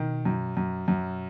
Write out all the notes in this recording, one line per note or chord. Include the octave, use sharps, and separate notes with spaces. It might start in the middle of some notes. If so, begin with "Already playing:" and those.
Already playing: B2 D#3
F#2
F#2
F#2